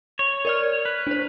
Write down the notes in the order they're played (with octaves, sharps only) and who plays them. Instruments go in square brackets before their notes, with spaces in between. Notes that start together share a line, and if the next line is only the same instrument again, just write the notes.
[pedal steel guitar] C#5
[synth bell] A#4 D5 F6
[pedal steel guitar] B4
[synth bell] D4 C5